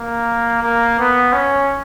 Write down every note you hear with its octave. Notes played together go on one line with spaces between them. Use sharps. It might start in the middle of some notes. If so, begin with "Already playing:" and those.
Already playing: A#3
A#3
B3
C#4